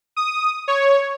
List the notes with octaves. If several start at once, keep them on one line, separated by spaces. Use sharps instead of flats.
D#6
C#5